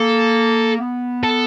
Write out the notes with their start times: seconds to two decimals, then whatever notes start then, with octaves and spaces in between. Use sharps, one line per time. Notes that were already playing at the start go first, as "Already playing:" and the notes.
Already playing: A#3 A4
0.80 B3
1.23 A4